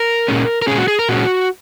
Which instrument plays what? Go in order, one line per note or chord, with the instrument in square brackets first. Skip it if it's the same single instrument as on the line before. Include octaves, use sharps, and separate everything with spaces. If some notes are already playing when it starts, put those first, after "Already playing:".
Already playing: [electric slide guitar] A#4
A#2 G#3 C#4
A#4
A#2 G#3 C#4 G#4
F#4
G#4
A#4
A#2 G#3 C#4 F#4